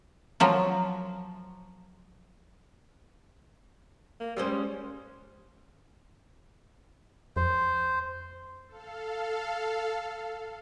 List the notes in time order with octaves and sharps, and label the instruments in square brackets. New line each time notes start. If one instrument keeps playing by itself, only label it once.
[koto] F3 F#3 F4
[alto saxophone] A#3
[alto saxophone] G3 [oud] G#3 C#4 C5
[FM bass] F2 [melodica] C5
[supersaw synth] A4 F5